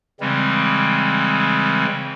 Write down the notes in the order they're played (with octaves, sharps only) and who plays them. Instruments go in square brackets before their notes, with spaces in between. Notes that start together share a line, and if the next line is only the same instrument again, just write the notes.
[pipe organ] C#3 E3 G3 G#3 C4